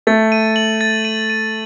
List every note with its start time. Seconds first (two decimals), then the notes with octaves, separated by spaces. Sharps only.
0.07 A3 A6
0.32 D#7
0.56 F#7
0.81 A6
1.05 D#7
1.30 D#7